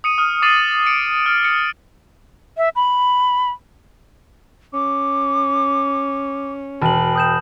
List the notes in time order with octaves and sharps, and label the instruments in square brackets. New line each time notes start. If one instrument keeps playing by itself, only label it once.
[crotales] D#6 C#7 D#7
D#6 F6
D6 A6 C7 D#7 F#7
C#7 D7
F6
C#7
[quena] E5
B5
[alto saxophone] C#4 [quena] D6
[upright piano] E1 [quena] G5 [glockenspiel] A5 F#7
[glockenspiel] D#6 G6 E7